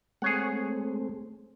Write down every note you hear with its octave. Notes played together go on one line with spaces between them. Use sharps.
G#3 A3 C4 G#4 C#5 F#5